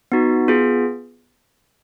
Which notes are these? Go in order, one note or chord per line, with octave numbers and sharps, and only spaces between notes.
B3 D#4 F#4
B3 F4 G#4